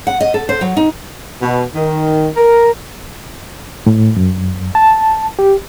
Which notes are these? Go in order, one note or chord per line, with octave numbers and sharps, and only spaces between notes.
F#5
D#5
A4
C5
F#3
D#4
B2
D#3
A#4
A2
F#2
A5
G4